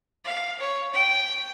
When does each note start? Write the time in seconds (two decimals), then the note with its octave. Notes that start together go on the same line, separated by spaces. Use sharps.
0.25 F5
0.60 C#5
0.93 G5